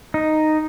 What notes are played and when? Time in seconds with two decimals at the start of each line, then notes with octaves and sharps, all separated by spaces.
0.14 D#4